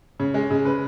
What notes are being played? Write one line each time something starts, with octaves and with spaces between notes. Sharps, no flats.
C#3
G#3
C#3
B4